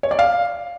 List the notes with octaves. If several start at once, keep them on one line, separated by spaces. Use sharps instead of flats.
C#5
D5
F5